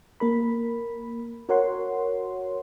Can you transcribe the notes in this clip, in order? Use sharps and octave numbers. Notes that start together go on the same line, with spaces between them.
A#3 A#4 B5
F#4 A#4 C#5 F#5 C6